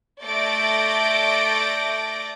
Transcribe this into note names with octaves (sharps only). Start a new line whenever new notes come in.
A3 D5 G6 A6 A#6 D7